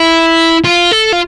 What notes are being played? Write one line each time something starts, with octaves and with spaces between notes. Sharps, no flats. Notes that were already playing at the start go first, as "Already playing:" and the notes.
Already playing: E4
F4
A4
F4